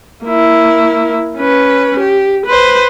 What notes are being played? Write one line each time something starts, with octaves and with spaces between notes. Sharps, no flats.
A#3 E4
C#4 B4
G4
B4 C5